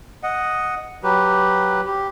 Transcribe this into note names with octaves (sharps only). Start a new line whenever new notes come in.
D#5 F#5
F#3 G4 B4
G4